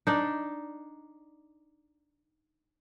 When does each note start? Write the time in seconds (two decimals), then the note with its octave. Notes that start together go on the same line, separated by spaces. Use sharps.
0.07 D4 D#4